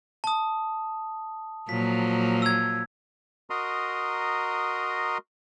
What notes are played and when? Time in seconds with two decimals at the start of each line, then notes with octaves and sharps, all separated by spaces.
0.24 A5 D#6
1.69 A#2 F3 F#3 B6
2.42 E6 G#6
3.50 F#4 A#4 D#5 A#5 C6 D#6